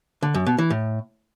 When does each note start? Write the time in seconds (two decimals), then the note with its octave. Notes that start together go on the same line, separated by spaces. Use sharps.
0.22 D3
0.34 F#2
0.46 B2
0.58 E3
0.70 A2